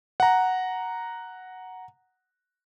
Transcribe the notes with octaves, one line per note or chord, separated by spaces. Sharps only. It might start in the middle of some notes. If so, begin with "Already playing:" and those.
F#5 A#5